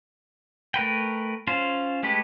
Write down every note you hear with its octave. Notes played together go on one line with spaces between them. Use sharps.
A3 A#4 B4 G5
C#4 F4 C5
G#3 A3 G4 B4